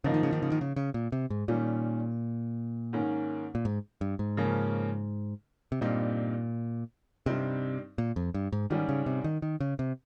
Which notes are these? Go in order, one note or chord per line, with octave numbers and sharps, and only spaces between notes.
G#2 C#3 F3 A#3 D#4
D#3
C#3
D#3
C#3
D#3
C#3
C#3
A#2
C3
G#2
A#2 D#3 G3 C#4
G#2 D#3 A#3 C#4
A#2
G#2
G2
G#2
C#3 F3 A#3 C#4
C3
G2 A#2 G3 C4 D#4
G2 C3 G3 C4 D#4
A#2
F2
G2
G#2
G#2 D#3 G3 C#4
C#3
C3
D#3
D#3
C#3
C3